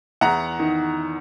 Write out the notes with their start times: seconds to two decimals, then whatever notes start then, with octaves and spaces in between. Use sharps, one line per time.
0.21 E2 F#5 A#5
0.59 D#3